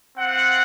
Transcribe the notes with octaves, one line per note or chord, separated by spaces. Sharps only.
C4 F4 F#5